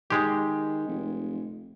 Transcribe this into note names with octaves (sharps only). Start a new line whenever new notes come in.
D#3 G#3 G4
F1